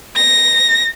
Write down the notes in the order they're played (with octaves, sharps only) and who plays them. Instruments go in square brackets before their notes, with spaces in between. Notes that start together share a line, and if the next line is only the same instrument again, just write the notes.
[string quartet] A#6